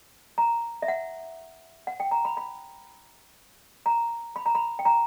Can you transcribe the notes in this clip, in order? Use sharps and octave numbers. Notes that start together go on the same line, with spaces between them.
A#5
E5
F#5
F#5
G5
A#5
B5
B5
A#5
B5
A#5
B5
G5
A#5